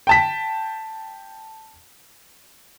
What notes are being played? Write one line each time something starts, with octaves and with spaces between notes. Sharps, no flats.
G5 A5 B6